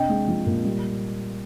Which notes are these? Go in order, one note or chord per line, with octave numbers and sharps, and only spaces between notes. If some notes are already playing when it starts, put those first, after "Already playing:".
Already playing: C3 D4 D#5 G5
G#3
F3
A#2
G3